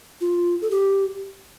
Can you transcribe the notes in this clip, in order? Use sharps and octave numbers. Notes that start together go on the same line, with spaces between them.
F4
A4
G4